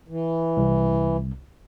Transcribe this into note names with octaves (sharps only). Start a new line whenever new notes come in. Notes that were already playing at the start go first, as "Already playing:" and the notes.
E3
C2